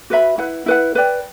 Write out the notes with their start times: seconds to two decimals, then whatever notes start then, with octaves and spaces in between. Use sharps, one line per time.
0.10 F#4 B4 E5 B5
0.38 E4 B4 F#5
0.66 E4 B4 F#5
0.95 B4 D5 G5